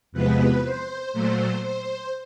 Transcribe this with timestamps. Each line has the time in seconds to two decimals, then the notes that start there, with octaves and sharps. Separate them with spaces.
0.12 E2 C3 F3 G#3 B3 B4
0.63 C5
1.13 A#2 F#3 A3 C5
1.62 C5